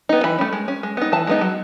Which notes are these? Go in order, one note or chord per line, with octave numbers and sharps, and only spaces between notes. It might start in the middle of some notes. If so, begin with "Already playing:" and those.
B3 D#4
E3 B5
A3 C#4
G#3
C#4
G#3
B3 D#4
E3 A5
G#3 B3 D#4
F#3